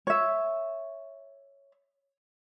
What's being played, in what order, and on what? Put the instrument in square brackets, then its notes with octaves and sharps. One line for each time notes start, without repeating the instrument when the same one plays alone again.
[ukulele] C#5 E5